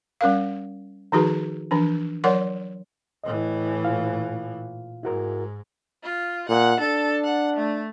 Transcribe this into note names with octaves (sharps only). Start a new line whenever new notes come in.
G3 C#4 A#4 F5
D#3 F3 D#4 F#4 G#4 B4
E3 F3 D4
F#3 A#4 C#5 D5 F#5 C6
A2 E3 D#5
A#2 F4 F5
G#2 E4 F#4 A#4
F4
A#2 F#5
D4 A4
F#5
A3